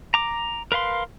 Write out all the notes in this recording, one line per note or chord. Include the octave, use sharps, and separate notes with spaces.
A#5 D6
A#4 B4 F5 C6